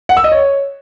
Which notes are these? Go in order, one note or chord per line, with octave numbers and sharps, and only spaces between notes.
F#5
E6
D#5
C#5